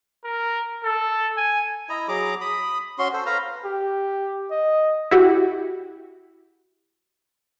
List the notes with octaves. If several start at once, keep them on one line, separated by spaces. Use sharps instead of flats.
A#4
A4
G#5
E4 D#5 A#5
F#3 G#4 A#5 D6
B5 D#6
C#4 F#4 C6
A4 C5
B4 F5 A#5
G4
D#5
E4 F#4 G4